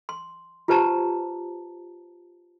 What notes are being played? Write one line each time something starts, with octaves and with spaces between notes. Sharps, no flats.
C6
F4 G4 B4 C5 A5 A#5